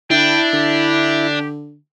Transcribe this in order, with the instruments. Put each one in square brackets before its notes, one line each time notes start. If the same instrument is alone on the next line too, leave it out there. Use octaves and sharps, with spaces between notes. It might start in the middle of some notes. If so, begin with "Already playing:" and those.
[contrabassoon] D3 [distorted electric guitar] D4 [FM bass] E4 [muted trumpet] G5
[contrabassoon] D3 [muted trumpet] G4